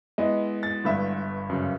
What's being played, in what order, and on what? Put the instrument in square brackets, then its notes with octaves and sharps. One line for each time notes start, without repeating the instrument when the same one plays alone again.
[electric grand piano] G#3 B3 E4 [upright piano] D#5
[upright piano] A6
G1 G2 E5
[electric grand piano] F#2 C#3